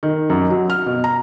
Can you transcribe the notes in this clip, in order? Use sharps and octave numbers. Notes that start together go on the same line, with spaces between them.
D#3
F#2
F#3
F6
B2
A#5